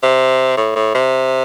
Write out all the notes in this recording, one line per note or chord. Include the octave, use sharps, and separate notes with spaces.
C3
A2
A2
C3